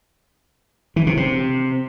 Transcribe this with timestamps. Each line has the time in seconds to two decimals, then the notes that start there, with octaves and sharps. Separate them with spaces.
0.96 E3
1.07 C3
1.17 C3